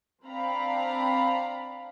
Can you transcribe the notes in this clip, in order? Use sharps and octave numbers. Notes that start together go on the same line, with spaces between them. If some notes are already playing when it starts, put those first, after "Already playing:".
C4 D4 D5 F5 A#5 B5